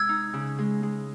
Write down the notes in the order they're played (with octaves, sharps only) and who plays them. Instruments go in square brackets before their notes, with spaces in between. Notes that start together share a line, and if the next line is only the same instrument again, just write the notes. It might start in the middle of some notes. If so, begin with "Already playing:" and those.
Already playing: [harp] C3 G#3 E4 [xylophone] E6 G#6
[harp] D#4
C#3
G#3
G#3